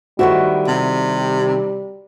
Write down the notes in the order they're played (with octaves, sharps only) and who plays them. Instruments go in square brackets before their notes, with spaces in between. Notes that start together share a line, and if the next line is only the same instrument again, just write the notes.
[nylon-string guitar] D#3 A3 E4 [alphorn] G3 [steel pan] F#4 C5
[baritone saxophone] C3